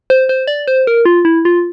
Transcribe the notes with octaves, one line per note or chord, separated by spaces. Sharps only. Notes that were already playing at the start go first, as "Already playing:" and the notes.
C5
C5
D5
C5
A#4
F4
E4
F4